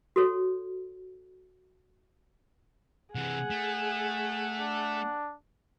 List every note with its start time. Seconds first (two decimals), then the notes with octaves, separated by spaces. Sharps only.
0.16 F#4 A4 C#5
3.15 C3 E3 G#4 F#5
3.50 A3
4.58 D4